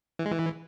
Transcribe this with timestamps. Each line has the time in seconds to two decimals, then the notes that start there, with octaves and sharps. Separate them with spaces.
0.19 E3
0.26 G#3
0.32 E3